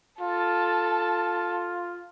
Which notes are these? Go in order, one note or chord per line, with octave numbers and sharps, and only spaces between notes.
F4 A4 A5